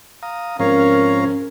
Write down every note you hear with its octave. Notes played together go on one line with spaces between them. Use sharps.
F5 A#5 D#6
G#2 F3 C4 C#4 A#4 C#5 F5 A#5